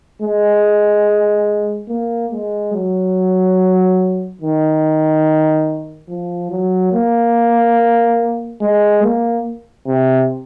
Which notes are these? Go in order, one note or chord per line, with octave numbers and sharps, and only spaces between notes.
G#3
A#3
G#3
F#3
D#3
F3
F#3
A#3
G#3
A#3
C3